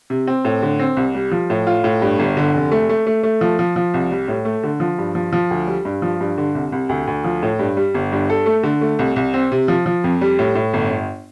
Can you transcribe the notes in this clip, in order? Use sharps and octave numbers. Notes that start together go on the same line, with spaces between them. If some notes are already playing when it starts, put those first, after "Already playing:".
C3
C4
A2
D3
C4
C2
G3
F3
A2
F4
A2
G2
G1
D3
F1
A3
A3
A3
A3
F3
F3
F3
C2
G3
A2
A3
D3
F3
G2
F3
F3
D2
G3
G2
F3
G2
D3
C2
C2
D2
D2
F3
A2
G2
G3
G1
G2
A4
A3
D3
A3
C2
C2
C4
C3
F3
F3
F2
G3
A2
A2
G1
G1